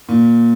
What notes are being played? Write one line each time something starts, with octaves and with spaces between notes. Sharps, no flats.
A#2